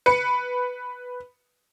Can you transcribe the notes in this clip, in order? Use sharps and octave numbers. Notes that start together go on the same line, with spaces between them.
B4 C#7